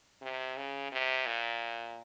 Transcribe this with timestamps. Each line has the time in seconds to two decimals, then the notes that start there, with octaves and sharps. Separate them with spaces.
0.22 C3
0.57 C#3
0.92 C3
1.26 A#2